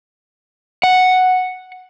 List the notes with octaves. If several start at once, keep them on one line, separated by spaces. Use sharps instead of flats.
F#5